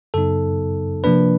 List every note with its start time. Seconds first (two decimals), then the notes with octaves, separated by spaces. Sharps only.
0.14 F#2 C#3 F#3 B3 D#4 A4
1.04 C3 F3 A#3 D4 B4